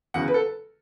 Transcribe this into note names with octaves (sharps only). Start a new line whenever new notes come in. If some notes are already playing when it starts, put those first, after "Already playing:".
E2 C#3 F#3 F#5
B4
A4